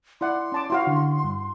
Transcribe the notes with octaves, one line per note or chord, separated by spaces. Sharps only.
E4 D5 F#5 C6
C#4 A5 D6
E4 F#4 F5
D3
G2